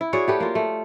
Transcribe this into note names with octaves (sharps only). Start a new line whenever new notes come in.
E4
F#4 G#4 C#5 D5
A3 G4 B4
A#3 F4
A3